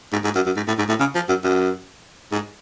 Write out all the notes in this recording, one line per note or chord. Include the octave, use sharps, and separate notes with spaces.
G#2
G#2
F#2
F#2
G#2
A2
G#2
A2
C#3
F3
F#2
F#2
G#2